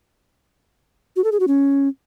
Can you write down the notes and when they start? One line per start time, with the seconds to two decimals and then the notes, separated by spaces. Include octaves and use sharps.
1.16 F#4
1.24 A4
1.32 G#4
1.40 F#4
1.48 C#4